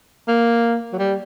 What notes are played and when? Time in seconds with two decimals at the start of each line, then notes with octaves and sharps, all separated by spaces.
0.28 A#3
0.93 F#3
0.99 G3